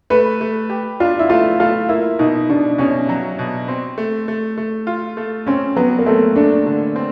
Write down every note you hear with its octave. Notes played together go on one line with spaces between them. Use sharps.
A3 B4
A3
G4
D4 F4
E4
A3 F4
A3 F4
A#3 E4
B2 D#4
B2 D4
B2 C#4
F#3
B2
C4
A3
A3
A3
F4
A3
C4 C#4
F#3 B3
A#3
A3 C4
A3 D4
D3
C4